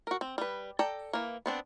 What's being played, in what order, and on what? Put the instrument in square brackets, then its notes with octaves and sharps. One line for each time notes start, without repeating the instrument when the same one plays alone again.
[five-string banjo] F#4 A#4
C4
G3 B4
A4 D5 G5 A#5
E3 A#3
B3 C4 D4